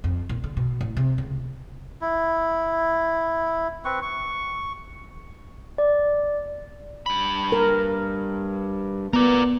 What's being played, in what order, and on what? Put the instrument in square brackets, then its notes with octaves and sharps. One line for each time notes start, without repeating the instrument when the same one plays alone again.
[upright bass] F2
A#2
D3
B2
A1
C3
C#2
[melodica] E4
C4 B4 C#6
C#6
[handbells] D5
[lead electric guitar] G2 B5
[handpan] A#4
[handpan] B3 [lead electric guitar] A#4 D5